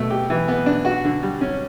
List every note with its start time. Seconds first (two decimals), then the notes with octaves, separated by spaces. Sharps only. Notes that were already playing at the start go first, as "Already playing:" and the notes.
Already playing: B2 A3
0.10 G4
0.30 E3
0.48 B3
0.66 D4
0.85 F#4
1.05 D3
1.23 G3
1.41 C#4